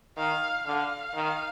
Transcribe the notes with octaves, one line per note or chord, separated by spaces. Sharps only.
D#3 F5
D3 F5
D#3